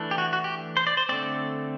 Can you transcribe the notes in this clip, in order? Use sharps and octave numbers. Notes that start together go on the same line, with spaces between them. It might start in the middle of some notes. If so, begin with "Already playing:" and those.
Already playing: E3 A3 D4
G4
F#4
F#4
G4
C5
D5
C5
D3 A3 C4 D5